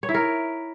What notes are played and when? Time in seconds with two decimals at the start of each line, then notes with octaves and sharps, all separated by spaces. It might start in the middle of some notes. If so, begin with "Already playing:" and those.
0.03 C#5
0.09 E4
0.14 A#4